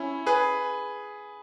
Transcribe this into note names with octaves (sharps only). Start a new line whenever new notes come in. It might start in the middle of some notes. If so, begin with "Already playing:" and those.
Already playing: C#4 E4
G#4 B4